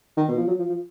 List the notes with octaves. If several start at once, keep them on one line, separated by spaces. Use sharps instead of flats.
D#3
B2
F3
F#3
F3
F3